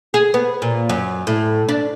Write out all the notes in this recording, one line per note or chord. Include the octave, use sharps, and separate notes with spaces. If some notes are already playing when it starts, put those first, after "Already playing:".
G#4
B3
A#2
F#2
A2
D4